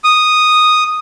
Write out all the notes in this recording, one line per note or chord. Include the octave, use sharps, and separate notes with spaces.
D#6